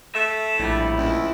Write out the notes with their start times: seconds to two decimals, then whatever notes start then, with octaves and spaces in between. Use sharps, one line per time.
0.15 A3 E5
0.59 A#1 A2 G3 E4
0.97 C#2